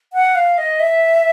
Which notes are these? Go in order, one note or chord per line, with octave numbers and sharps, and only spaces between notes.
F#5
F5
D#5
E5